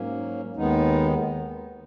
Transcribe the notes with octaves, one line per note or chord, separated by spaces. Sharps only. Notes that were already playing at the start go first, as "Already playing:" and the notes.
Already playing: G#2 F#3 A#3 C#4
D#2 D#3 G#3 B3 D#4